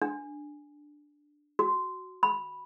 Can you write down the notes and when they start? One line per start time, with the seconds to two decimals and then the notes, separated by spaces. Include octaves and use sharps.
0.02 D4
1.59 F#4
2.23 B5